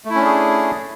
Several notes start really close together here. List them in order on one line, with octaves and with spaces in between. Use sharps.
A3 E4 C#4 D4 G#4